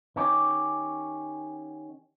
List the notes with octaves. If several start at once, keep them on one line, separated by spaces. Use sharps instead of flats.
D#3 C#4 G4